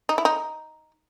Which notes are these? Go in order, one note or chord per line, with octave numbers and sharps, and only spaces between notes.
D#4
E4
D#4